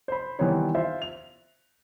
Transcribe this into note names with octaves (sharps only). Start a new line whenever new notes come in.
C5 B5
D#3 E3 G3 B3 C4 C#5
F4 C5 E5
F7